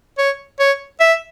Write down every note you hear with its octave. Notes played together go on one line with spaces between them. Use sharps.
C#5
C#5
E5